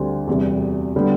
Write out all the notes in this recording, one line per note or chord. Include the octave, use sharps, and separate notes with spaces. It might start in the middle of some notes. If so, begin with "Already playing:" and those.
Already playing: D2 D3 G3 C4 G4
E2 C3 G3
D3 G3 B3